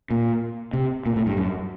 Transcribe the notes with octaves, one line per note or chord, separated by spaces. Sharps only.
A#2
C3
A#2
A2
G2
F#2